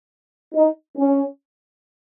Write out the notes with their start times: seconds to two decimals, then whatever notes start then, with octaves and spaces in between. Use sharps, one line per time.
0.54 D#4
0.97 C#4